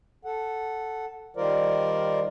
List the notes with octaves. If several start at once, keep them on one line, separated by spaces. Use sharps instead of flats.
A4 F#5
D#3 G3 F4 A#4 C5 D5